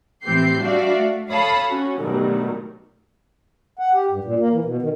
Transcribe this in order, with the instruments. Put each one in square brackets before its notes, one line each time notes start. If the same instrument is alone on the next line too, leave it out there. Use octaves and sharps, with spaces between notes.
[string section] A2 E3 C4 G4 G6 C7
G3 D4 F#4 D5 E5 F5
A3
A4 C#5 F5 A5 B5 D#6
C#4 F#4
G2 B2 D#3 F#3 A3
[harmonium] F#5
G4
G2
A#2
A#3
E3
B2
D#3